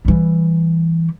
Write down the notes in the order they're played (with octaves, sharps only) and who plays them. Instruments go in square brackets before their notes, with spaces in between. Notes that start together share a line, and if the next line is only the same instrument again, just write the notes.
[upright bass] E3 G3